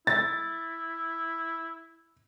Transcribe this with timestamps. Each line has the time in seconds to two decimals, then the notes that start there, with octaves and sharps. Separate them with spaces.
0.07 E4 A6